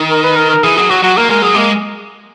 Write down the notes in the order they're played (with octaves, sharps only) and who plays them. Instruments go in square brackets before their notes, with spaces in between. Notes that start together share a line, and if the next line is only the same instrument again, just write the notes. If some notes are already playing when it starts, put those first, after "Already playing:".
Already playing: [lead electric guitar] D#3
[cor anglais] A#4
B4
A#4
A#4
[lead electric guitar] E3 [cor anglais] G#4
[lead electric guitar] F#3 [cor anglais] G#4
[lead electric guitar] F#3 [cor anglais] F#4
[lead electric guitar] F#3 [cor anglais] F#4
[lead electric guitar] A#3 [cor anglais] A#4
[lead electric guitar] G#3 [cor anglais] A#4
[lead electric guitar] F#3 [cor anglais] G#4
[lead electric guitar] G#3 [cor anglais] A#3